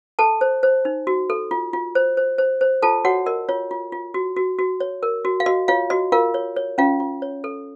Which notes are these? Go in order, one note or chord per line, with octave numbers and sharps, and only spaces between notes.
A4 A5
C5
C5
D#4
F#4
A4
F4
F4
C5
C5
C5
C5
F4 A4 A5
F#4 C#5 F#5
A#4 D#5
F4 C#5
F4
F4
F#4
F#4
F#4
C#5
A#4
F#4
F5
F#4 D#5
F4 C#5 F5
F#4 D#5
F4 A#4 F5
C#5
C#5
C#4 F4 F5
F4
C#5
A4